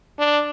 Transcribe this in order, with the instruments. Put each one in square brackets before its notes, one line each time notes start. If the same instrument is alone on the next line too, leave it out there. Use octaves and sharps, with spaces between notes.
[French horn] D4